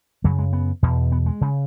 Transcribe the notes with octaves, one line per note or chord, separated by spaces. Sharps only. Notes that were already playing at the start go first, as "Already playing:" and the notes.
F#2 C#3 F#3
G#3
B3
E2 B2
B3
G#3
C#3